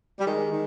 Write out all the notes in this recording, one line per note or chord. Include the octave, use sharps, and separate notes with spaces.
G3
D#3 G#3
D#3